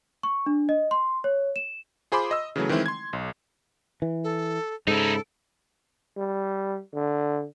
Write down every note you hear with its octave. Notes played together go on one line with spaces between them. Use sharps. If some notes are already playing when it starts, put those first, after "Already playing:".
C#6
D4
D#5
C6
C#5
E7
F4 G#4 C5 B5 C6 D6
D#5 E6
C#3 E3 F#3 A3
D#3 E3 G#3 C4 E4
C6 G#6
B1
E3
A4
G#2 C#3 D#4 E4 A4
G3
D3